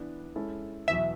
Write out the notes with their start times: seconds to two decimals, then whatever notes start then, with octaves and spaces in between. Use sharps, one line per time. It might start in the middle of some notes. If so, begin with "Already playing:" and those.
Already playing: E3 B3 D4
0.36 G#3 C#4 E4 A4
0.88 E2 B2 F#3 E5